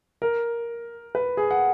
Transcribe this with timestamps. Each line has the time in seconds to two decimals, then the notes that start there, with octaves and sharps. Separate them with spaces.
0.22 A#4
1.15 B4
1.37 G#4
1.51 F#5